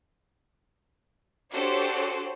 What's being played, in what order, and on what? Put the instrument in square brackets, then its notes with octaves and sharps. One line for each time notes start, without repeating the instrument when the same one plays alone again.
[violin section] D4 F#4 G4 A4 C5 C#5